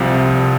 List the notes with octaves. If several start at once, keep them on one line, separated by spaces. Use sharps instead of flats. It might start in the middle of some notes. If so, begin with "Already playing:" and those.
Already playing: C2 C3 F3 F5
C2